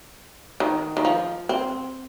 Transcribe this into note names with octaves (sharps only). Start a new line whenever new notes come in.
D#3
D#3
F3
C4